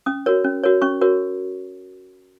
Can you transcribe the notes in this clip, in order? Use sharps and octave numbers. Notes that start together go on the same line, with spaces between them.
C#4 D#6
F#4 A#4 C#5
C#4
F#4 A#4 C#5
C#4 C#6
F#4 A#4 C#5